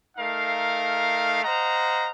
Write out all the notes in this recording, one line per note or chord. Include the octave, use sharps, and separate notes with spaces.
A3 D#4 A#4 F5
C5 D#5 F5 F#5 A#5